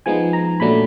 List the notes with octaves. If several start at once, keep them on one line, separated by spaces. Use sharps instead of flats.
F3 G#3 B3 D#4 G#5
A#5
A#2 F#3 A3 D4 B5